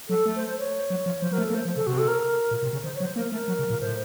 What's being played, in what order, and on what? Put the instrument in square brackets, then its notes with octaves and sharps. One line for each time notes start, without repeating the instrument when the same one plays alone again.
[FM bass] F#3 [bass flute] A4
[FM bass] A3
[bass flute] C5
C5
C#5
[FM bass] F#3
F3
[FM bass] F3 [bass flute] C5
[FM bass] F#3 [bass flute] A#4
[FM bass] A3
[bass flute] A4
[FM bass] A#3
[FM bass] A3 [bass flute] C5
[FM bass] F3
[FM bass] C#3 [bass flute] A4
[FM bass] C3 [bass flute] F#4
[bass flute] A4
A#4
[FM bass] A#2
C3
C#3
[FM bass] D#3 [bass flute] C5
[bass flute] C#5
[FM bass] F#3
[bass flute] C5
[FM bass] A#3 [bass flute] A#4
[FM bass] A3 [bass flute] A#4
[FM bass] F#3
C#3
A#2
[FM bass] A2 [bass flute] C5